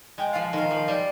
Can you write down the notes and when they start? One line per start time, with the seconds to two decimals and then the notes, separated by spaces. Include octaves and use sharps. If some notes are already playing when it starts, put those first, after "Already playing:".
0.18 G#3 G5
0.32 F5
0.35 F3
0.53 D#3 F5
0.71 F3
0.88 G3